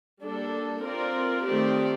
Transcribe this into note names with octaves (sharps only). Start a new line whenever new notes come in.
G3 A#3 D4 A4
C4 F4 A#4 D5
D#3 A3 C4 G4 D5